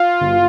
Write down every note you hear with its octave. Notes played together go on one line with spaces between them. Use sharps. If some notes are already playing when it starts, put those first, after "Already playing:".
Already playing: F4
G1